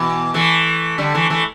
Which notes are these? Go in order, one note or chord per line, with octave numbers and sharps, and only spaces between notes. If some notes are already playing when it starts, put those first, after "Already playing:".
Already playing: B2 E3
E3 A3
D3 G3
E3 A3
E3 A3